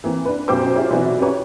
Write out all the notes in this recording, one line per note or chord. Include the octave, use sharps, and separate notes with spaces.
E3 A#3 C4
D4 B4
B1 F#2 G4 C5 G5 D6
E4 F4 G4 G#4 C5 C#5
B1 C3 E3 E4 F#4 D5
C#4 G4 B4 C#5